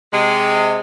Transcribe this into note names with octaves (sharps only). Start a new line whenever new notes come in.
C3 G#3